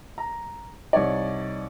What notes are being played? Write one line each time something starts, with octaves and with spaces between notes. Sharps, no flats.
A#5
C2 D#4 C#5 D5